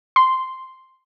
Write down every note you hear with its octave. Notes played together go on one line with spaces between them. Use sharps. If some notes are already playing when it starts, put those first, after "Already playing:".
C6